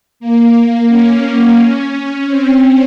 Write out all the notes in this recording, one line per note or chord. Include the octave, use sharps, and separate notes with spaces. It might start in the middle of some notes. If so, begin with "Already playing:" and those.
A#3
C#4
C4